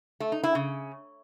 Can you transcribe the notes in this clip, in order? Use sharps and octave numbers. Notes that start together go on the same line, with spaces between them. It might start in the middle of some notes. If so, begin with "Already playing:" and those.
A3
D#4
E4
C#3